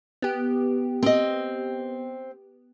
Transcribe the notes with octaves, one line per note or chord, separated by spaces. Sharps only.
B3 G4
C4 D#5